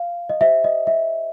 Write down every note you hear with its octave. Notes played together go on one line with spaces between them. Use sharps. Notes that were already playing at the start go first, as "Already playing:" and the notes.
Already playing: F5
D#5
G4 C5 E5
D#5
E5